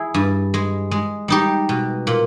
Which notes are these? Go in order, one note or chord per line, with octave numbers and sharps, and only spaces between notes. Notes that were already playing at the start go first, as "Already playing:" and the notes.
Already playing: E4 G#4
G2
G#3
G#3
G3 D#4 G4
B2
A#2